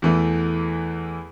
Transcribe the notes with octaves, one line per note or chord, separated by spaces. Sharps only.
E2 E3 A3